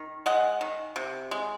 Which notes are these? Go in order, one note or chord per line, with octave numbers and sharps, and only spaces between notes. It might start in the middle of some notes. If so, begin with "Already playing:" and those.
Already playing: D#3
G#3 D#5 F#5
D#3
C3
G#3